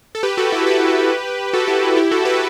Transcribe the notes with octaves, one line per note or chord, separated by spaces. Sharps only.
A4
G4 B4
F#4 A4
E4 G4
G4 B4
F#4 A4
E4 G4
E4 G4
F#4 A4
G4 B4